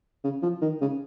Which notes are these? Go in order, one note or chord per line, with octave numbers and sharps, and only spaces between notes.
C#3
F3
D#3
C#3